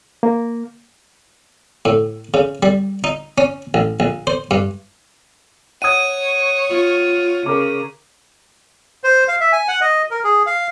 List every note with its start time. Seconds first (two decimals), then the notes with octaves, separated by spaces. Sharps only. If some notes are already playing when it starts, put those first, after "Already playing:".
0.23 A#3
1.85 A2
2.34 C#3
2.63 G3
3.04 D#4
3.38 C#4
3.74 A1
4.00 A#1
4.27 C5
4.51 G2
5.82 C#5 F#5 D#6 G#6 D#7
6.69 F4
7.46 C#3 A#4 D6
9.04 C5
9.28 F5
9.41 E5
9.52 G#5
9.68 F#5
9.81 D#5
10.11 A#4
10.24 G#4
10.46 F5